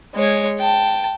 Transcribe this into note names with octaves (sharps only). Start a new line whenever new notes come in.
G#3 C#5
G5 A5